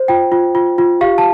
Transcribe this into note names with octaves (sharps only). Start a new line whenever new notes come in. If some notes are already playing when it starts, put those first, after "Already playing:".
Already playing: C5
F4 G5
F4
F4
F4
G4 F5
A5